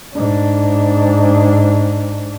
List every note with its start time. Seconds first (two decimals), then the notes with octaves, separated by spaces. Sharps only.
0.14 G#2 D4